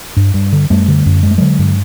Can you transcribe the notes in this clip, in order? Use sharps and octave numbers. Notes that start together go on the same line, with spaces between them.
G2
G2
D3
F#2 G3 A3
D3
F#2
G2 G#3
A3
D3 F#3 G#3
G2